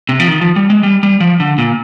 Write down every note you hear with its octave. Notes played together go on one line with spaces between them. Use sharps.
C3
F3
D#3
F3
G3
G#3
G3
G3
F3
D3
A#2